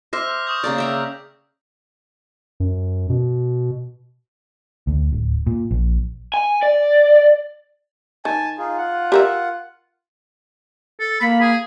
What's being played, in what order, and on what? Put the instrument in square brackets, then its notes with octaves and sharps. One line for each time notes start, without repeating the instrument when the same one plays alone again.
[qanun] C5 E5 [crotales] D6 F6 A#6
[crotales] F6
C#6 D#6 G6
[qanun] C#3 A#3 D5
E5 G5 A#5
[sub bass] F#2
B2
[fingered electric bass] D2
D1
A#2
A#1
[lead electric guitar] G#5
D5
[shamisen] D#3 [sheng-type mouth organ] G#5 A5
[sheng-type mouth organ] D#4 F4 G#4
F4 F#5
[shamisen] G4 A#4 E5
[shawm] A4
[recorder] A#3 [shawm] B5
[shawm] G#4